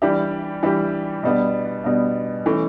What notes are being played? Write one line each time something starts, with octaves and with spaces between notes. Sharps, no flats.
E3 G3 D4 G4
E3 G3 D4 G4
B2 G3 B3 D4
B2 G3 B3 D4
E3 A3 C#4